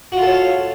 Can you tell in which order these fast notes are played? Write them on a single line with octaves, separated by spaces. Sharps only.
F#4 F4 A4 C#5 F5